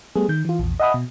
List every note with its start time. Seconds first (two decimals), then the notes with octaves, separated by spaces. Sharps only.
0.16 G3 A3 B3 G#4
0.29 D#3 G6
0.45 E3 F4
0.59 A#1 E2
0.80 D#5 E5 F#5 G#5 B5 D#6
0.94 B2